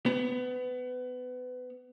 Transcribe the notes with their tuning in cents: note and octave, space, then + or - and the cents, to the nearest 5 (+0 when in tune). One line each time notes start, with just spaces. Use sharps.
B3 +25